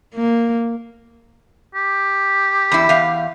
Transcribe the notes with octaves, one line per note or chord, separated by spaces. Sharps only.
A#3
G4
E2 E4
E2 F5